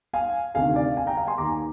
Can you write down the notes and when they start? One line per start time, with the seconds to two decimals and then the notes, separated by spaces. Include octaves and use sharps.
0.13 F5 G#5
0.55 D2 C3 D#3 F5 G#5
0.76 D5 F5
0.97 F5 G#5
1.07 G5 A#5
1.17 F5 G#5
1.27 G#5 C6
1.38 D#2 D#3 A#5 D6